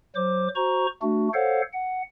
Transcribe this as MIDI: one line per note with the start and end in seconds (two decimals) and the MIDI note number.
0.16 0.48 54
0.16 0.48 72
0.16 0.48 86
0.56 0.87 66
0.56 0.87 72
0.56 0.87 82
0.56 0.87 85
1.02 1.29 57
1.02 1.29 62
1.02 1.29 66
1.34 1.62 69
1.34 1.62 72
1.34 1.62 73
1.34 1.62 77
1.34 1.62 78
1.73 2.02 78